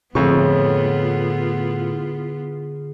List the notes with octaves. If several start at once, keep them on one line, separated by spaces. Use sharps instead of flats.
F2 A2 D3 B3 F4 G#4 C#6